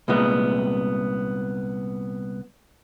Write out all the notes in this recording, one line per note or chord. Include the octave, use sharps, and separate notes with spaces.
C2 A#2 G#3 B3